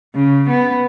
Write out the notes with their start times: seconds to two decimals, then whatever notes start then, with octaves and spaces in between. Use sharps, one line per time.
0.15 C#3
0.49 B3